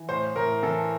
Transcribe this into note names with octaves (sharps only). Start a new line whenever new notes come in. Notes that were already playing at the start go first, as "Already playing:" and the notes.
Already playing: E3
A2 C5
A2 A#4
E3 A4